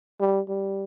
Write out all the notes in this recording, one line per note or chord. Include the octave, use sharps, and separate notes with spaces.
G3
G3